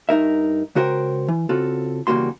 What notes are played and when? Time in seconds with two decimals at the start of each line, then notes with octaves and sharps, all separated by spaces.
0.09 G2 D#4 A#4 E5
0.75 C#2 C#3 F#4 A#4 C5 G5
1.28 E3
1.49 C#3 C4 F4 F#4 A4
2.07 E2 C#3 G3 A#3 F#4 C6